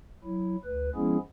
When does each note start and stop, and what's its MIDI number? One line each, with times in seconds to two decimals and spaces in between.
0.25 0.56 54
0.25 0.56 64
0.65 0.90 38
0.65 0.90 71
0.95 1.18 53
0.95 1.18 56
0.95 1.18 59
0.95 1.18 61
0.95 1.18 64
0.95 1.18 68